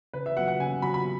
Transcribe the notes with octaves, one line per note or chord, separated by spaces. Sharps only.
C#3 B4
E5
F#3 B3 F#4 F#5
F#5
C#3 G#5
F#3 B3 F#4 B5
B5